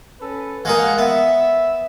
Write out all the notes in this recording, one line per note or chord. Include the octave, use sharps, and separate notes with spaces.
C#4 A4 B4
G#3 A#3 G#4 F5 F#5
B3 E5